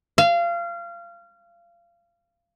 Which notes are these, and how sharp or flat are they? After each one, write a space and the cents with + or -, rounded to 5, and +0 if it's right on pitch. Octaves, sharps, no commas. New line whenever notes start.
F5 -25